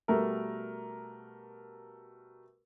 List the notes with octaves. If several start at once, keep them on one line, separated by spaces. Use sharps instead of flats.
B2 G3 A3 A#4